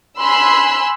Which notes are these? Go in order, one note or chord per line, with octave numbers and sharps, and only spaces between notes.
G#5 B5 C6 E6 F#6